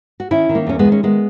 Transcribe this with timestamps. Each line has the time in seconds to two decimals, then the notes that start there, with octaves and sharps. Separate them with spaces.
0.20 F#4
0.31 D#3 C#4 E4
0.49 D#3
0.55 A#3 C#4
0.67 E2 C#4
0.79 G#3 B3
0.85 D#3
0.92 C#4
1.03 D#3 G#3 B3